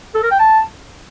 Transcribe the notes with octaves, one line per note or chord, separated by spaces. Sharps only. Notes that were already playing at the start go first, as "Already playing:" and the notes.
A4
A#4
G5
A5